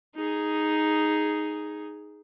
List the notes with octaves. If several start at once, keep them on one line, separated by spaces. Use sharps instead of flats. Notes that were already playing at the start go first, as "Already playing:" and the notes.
D#4 G#4